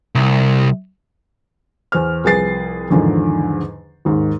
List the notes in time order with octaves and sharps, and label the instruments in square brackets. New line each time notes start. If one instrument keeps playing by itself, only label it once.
[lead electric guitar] C2
[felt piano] E2 C5 F6
C2 F3 G#4 B4 A6 C7
E2 G#2 D3 D#3 F3
D#2 G#2 D#3